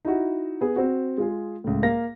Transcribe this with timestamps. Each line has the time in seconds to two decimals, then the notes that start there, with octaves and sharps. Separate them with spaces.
0.05 D#4 E4 F#4
0.61 B3 G#4
0.76 C4 F#4
1.18 G#3 F4 G#4
1.64 C#2 A2
1.82 A#3 A#4 F5 A#6